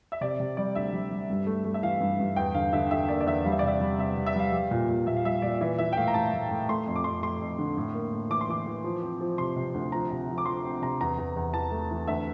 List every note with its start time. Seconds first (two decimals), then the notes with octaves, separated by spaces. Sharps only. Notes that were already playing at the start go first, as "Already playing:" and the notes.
0.12 E5
0.21 C3 D5
0.40 C3
0.57 G3 D5
0.75 D2 E5
0.93 G3
1.11 G3
1.30 G2
1.47 A3
1.65 A3
1.74 E5
1.83 E3 F5
2.00 G2
2.20 G2
2.36 E2 G5
2.54 D3 F5
2.73 D3 E5
2.91 D3 E5
3.08 A#3 D5
3.21 D5
3.26 E2 E5
3.45 G3 F5
3.52 E5
3.59 D5
3.62 C3 E5
3.80 G3
3.98 C3 E5
4.17 C3
4.26 E5
4.35 G3 F5
4.52 G3
4.71 A#2
4.88 A#2
5.07 A#2 E5
5.16 F5
5.25 G3 E5
5.42 A#2 D5
5.61 E3 E5
5.79 E3 E5
5.93 G5
5.97 A2 F5
6.08 A#5
6.14 A2 A5
6.33 A2
6.51 A2
6.69 A3 C6
6.86 F2
6.96 D6
7.04 F2 C6
7.22 A3 C6
7.41 F2
7.59 D3
7.77 A2
7.94 A#3
8.13 A2
8.30 E3 D6
8.41 C6
8.49 E3 D6
8.67 E3
8.84 F3
9.02 C4
9.21 F3
9.38 C3 C6
9.56 C3
9.74 D2
9.92 F3 A#5
10.10 C3
10.29 F3
10.38 D6
10.46 F3 C6
10.65 C4
10.82 C3 A#5
11.01 E2 A#5
11.18 E2
11.36 E2
11.53 E3 A5
11.71 A3
11.91 E3
12.07 D2 E5